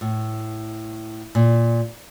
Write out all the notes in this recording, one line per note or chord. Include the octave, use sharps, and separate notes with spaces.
A2
A#2